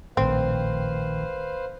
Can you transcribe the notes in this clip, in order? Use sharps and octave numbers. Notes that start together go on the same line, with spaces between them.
A#1 A2 D#3 C4 B4 C5 F5